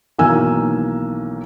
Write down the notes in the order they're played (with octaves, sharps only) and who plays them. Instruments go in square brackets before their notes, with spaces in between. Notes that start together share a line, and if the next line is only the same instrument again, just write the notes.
[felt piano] B1 D#3 E3 A#3 G#5 E6